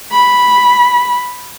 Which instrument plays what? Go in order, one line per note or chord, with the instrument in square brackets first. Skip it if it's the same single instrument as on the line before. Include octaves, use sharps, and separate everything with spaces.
[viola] B5